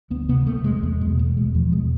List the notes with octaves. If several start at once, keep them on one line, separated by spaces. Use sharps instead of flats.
D2 B3
C3 B3
C3 A3
E2 G#3
E2 A3
B2 G#3
B2 A3
E2 G#3
E2 F3
B2 G#3